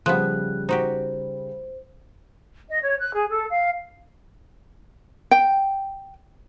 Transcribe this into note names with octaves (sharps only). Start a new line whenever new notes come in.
C#3 F3 G3 B3 F#6
D#4 F#4 G4 C5
D#5
C#5
F#6
G#4
A4
F5
G5